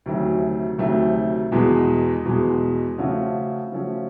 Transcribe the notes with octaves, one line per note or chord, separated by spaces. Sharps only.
D2 C3 D#3 F#3 A3
D2 C3 D#3 F#3 A3
E2 B2 G#3
E2 B2 G#3
C#3 F3 A3 C#4 F#4
C#3 F3 A3 C#4 F#4